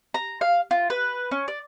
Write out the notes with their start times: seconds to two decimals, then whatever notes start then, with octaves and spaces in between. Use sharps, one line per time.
0.14 A#5
0.41 F5
0.71 F4
0.90 B4
1.31 C#4
1.48 D5